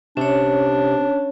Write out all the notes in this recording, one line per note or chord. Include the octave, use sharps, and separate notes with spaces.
C3 C#4 D4 C#5